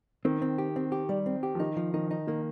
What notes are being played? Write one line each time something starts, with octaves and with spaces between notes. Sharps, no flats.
D#3 C4
C4
G4
C4
G4
G3
C4
G4
F3
D#3 D#4
F3
D#3 D#4
D#4
D#3 A#3